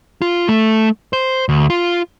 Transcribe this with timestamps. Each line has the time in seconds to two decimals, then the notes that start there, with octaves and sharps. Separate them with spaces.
0.22 F4
0.48 A3
1.13 C5
1.49 D2
1.70 F4